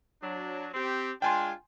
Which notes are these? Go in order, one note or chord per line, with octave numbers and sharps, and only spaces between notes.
F#3 D4
C4 G4
G#3 D4 F4 G5 G#5 C6